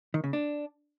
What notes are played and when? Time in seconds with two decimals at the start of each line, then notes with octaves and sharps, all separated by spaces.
0.14 D#3
0.24 C#3
0.33 D4